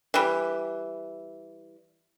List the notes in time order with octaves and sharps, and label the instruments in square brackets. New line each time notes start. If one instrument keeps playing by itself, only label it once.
[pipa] E3 G3